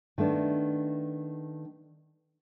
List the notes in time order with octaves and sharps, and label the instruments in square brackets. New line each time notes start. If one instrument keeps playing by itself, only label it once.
[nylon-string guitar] D#3 A3 B3 D4